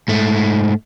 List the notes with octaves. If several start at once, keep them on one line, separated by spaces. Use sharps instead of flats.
G#2 A3